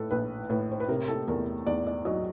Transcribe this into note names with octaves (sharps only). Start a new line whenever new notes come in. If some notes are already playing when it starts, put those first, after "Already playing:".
Already playing: A2 A4 B4
A#1 B4
A2 B4
C5
B4
C3 A#4
A4
E2 A#4
E2 D5
D5
F#3 D#5